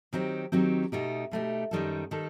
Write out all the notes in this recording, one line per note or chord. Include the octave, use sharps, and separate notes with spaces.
D#3 F#3 C4 D#4 G4
D#3 F#3 C4 D#4 G4
B2 A3 D#4 G4
B2 A3 D#4 G4
F#2 D#3 G3 D#4 A4
D#3 G3 D#4 A4